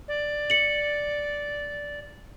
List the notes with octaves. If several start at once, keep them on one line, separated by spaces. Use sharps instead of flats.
D5
C#7 F#7